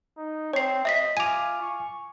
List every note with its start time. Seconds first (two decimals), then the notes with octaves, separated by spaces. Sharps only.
0.17 D#4
0.53 C4 C#5 C7
0.85 D#5 E5 A#6 B6
1.17 F4 G#5 D6 D#7 F7
1.61 C#6